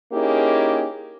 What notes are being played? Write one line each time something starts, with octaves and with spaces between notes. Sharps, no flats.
A#3 C#4 D#4 E4 G4 G#4